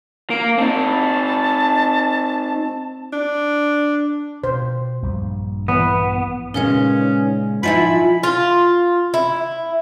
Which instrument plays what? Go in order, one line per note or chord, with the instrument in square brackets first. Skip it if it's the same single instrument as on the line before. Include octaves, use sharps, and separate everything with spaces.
[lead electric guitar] A#3 [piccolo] D7
[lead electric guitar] C4 D#4 [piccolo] A5
[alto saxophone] D4
[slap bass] B2 [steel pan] C5
[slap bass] A#1 G2 G3
[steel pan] E3 [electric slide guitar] B3
[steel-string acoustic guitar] A#2 C#3 G#3 [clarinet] C#4 [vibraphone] D#4 B4 C#5
[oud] F3 D#4 E4 [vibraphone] F#5 G#5 [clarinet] B5
[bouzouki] F4
E4